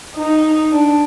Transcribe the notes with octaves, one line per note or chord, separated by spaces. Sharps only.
D#4
D4